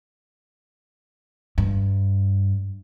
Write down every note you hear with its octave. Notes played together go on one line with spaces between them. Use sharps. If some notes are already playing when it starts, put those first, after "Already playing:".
G2